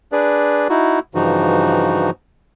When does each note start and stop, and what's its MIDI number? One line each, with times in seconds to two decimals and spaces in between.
0.12 0.68 62
0.12 0.68 68
0.12 0.68 71
0.12 0.68 74
0.69 0.99 63
0.69 0.99 64
0.69 0.99 66
1.15 2.10 43
1.15 2.10 49
1.15 2.10 52
1.15 2.10 53
1.15 2.10 63
1.15 2.10 66